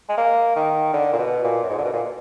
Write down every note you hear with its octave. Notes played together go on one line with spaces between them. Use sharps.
G#3
A#3
D#3
D3
A#2
B2
A#2
F#2
G#2
D3
B2
A#2